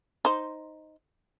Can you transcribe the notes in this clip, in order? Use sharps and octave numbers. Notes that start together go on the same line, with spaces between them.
D#4 C5